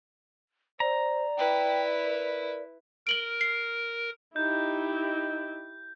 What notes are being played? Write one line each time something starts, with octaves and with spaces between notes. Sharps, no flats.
C5 D5 A#5
E4 B4 G5
A#4
A#4 D7 F#7 G7
C7
D#4 E4 G4 G6